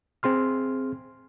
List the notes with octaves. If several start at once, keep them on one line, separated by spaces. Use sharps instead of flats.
C4 G#4 C6 F6